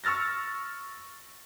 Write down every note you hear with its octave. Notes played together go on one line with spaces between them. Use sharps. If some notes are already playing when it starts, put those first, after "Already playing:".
C#6 E6 F6 A6 A#6